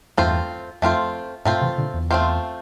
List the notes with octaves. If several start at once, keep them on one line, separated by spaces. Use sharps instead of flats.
E2 G2 A3 C4 F4 C5
F2 A3 C4 F4 C5
G2 A#2 A3 C4 F4 C5
C3 E3
A#2 D3
E2
A3 C4 F4 C5